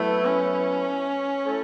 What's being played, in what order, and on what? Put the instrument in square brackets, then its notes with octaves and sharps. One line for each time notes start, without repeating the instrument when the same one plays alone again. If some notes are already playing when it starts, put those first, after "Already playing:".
Already playing: [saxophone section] F#3 B3 E4 B4 [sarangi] A3
[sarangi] C#4
[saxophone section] A3 E4 A4 C#5